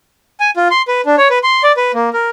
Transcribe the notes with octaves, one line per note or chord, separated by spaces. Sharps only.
G#5
F4
C6
B4
D4
C#5
B4
C6
D5
B4
A#3
A#4